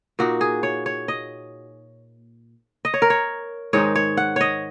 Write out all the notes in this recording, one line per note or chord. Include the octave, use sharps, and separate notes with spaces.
A#2 A#3 D#4 F#4
G#4
C#5
C#5
D#5
D#5
C#5
A#4
C#5
G#2 D#3 G#3 D#4 C#5
C#5
F#5
C#5 D#5